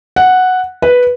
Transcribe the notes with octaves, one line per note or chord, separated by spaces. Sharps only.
F#5
B4